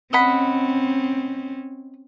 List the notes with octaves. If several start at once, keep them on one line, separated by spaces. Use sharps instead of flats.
C4 C#4 D#5 F#5 B5